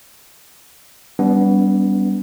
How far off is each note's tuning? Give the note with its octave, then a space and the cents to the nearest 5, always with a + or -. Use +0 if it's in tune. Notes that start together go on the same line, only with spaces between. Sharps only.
G3 +0 B3 +0 D4 -45